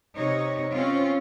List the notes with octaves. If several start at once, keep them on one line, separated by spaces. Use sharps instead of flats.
C3 D#4 C#5
C4 C#4 F4